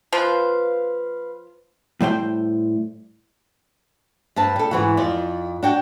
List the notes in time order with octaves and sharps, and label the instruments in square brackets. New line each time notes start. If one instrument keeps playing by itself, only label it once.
[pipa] F3 C5 [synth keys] B4 F5
[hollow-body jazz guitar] A2 G3 C5 G5
[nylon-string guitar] G2 C4 A5
G3 A4
G#2 E3 F#4
F2 D5
D4 F#4 G5